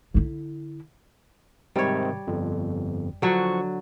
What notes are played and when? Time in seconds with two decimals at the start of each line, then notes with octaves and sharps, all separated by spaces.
0.14 D3 E4
1.76 G#2 C3 D#3 G3 C#5
2.27 G1 F2
3.22 D3 F3 F#3 C#6